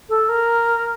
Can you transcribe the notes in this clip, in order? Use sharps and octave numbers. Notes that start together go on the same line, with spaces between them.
A4
A#4